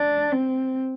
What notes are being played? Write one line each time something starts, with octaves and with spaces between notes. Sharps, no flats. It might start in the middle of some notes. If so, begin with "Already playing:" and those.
Already playing: D4
C4